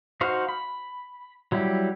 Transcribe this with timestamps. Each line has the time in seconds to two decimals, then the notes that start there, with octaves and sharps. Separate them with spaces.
0.21 D#4 F#4 C5 F5
0.48 B5
1.52 F#3 G3 E4 G4